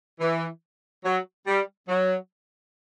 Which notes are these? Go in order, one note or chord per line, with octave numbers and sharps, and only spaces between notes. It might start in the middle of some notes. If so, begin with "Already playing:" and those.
E3
F#3
G3
F#3